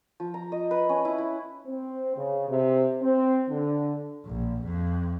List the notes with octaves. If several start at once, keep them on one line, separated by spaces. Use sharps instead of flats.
F3
A#5
D#5
B4
C#4
E4
E4
C4
C#3
C3
C4
D3
A#1
F2